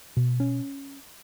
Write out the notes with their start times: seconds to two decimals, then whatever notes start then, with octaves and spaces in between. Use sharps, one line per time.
0.17 B2
0.40 C#4